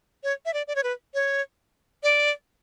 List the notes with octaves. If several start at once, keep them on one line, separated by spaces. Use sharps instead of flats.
C#5
E5
D5
D5
C#5
B4
C#5
D5